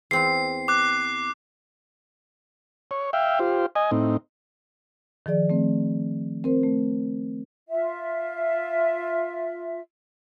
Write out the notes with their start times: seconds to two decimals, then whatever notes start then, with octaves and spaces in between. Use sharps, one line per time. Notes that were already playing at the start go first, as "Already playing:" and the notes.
0.11 E2 C4 F4 C7
0.68 D6 F#6
2.91 C#5
3.13 E5 F5 G5
3.39 F4 G4 C5
3.76 D#5 G#5
3.91 A2 C4 D#4
5.26 D#3 F3 G#4 D5
5.50 A3 C4
6.44 C4 A#4 C5
6.64 A3
7.68 F4 E5